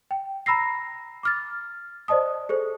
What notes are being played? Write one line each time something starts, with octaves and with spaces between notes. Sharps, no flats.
G5
A#5 B5 E6 A#6 C7
D6 F6 A6
C5 D5 D#5 A5 D#6
G#4 A4 C5